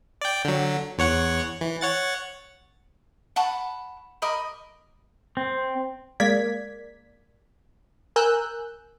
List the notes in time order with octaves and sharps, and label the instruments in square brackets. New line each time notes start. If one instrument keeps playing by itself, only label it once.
[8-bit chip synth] D5 G5
D3 F#3
E2 C#5 F#5
E3
C#5 F#5 A6
[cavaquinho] F#5 A5 B5 C#6
A#4 D#5 B5 D6
[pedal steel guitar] C4
[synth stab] G#3 A#3 A#4 D5 G#6 B6
A#4 G#5 E6 F#6 G6